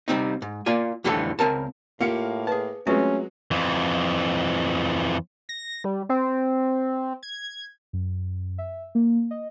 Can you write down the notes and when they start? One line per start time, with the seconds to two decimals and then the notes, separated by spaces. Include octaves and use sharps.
0.08 C3 G3 C4 D#4
0.42 G#2
0.66 A#3 F4 D5 G#5
1.04 F2 A2 D3 E3 G3 A4
1.39 C#2 C4 A#4 A5
2.01 A2 A#3 F4 G4 F5 C#7
2.47 G#4 B4 A5
2.87 F#3 G#3 A3 C4 C#4 F4 B4
3.51 F2 E3
5.49 A#6
5.84 G3
6.09 C4
7.23 G#6
7.93 F#2
8.58 E5
8.95 A#3
9.31 D#5